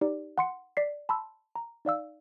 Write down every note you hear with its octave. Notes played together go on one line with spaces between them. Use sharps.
D#4 G4 D5
F#5 C6 C#7
D5 B6 C7
A5 B5 C6 E6
A#5
D#4 D5 F5 E6